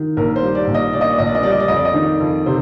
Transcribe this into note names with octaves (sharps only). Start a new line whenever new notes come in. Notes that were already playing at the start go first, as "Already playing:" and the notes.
Already playing: D#3
A#1 A#4
C5
G3
D5
A#1
D#5
A#2 D5
D#5
D5
A#1 D#5
D5
D#5
G3 D5
D#5
D5
F2 D#5
D5
D#5
D#3 D5
F2
C3 C5